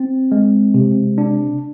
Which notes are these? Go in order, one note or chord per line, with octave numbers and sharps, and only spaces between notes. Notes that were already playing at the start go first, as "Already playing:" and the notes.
Already playing: C4
G#3
C3
D4